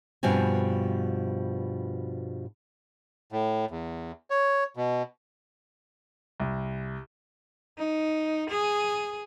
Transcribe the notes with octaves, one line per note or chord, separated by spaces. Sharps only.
G2 B2 F3 C4 G#5
A2
E2
C#5
B2
C2
D#4
G#4